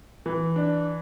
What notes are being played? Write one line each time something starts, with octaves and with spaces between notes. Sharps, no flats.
E3
D4